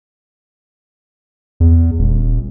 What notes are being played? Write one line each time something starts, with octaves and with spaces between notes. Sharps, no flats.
E2
D#1